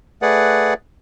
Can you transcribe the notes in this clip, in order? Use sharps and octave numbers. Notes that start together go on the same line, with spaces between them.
A3 G#4 B4 D5 F#5